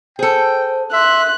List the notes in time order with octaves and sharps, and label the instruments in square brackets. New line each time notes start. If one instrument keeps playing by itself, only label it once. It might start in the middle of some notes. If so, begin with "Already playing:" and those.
[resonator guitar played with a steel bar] G#4 A4 [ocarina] C5 [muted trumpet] G5
[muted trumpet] E5 [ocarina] C6 [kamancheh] F#6